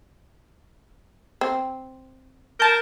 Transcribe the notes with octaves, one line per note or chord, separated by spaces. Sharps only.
C4
A#4 A5 G6